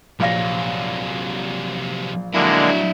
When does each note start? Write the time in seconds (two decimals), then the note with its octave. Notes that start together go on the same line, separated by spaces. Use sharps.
0.20 A#1 C3 F#3 F5 A#6
2.34 D3 F#3 G#3 A#3 D4 E4